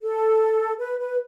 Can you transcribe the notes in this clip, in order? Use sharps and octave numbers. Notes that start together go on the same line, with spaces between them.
A4
B4
B4